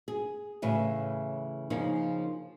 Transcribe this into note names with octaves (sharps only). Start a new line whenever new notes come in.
G#4
A2 C#3 E3
C#3 F3 A#3 C#4 D#4